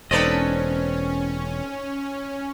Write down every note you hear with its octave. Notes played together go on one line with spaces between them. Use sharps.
E1 C4 C#4 D#4 A4 B4 D5 D#5